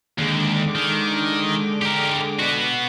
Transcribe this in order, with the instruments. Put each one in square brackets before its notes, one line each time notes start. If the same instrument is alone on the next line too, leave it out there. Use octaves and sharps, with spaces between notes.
[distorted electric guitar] D#2 [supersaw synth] D3 G#3 D6
[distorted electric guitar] D#3
G4 A#4
B3 F#4